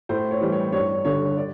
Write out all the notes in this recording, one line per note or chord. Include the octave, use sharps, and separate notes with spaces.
A2 C5
C#5
E3 G3
C#5
G2 C#5
D3 G3 C#5
D5